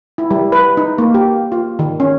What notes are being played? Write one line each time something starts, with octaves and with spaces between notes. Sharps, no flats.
E4
G3
B4
D#4
A#3
G4
F4
D#3
C#4